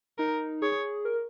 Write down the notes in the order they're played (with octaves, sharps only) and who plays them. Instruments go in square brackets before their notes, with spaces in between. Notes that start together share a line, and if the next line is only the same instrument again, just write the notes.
[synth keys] D#4 [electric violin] A#4
[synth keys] G#4 [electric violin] C#5
[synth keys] A#4